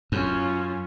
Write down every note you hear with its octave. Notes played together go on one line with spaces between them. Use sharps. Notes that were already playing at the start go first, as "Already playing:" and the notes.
F#2 C#4 F4